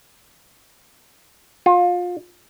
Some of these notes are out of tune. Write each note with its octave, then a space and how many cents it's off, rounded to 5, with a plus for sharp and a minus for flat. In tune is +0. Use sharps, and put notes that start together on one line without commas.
F4 +25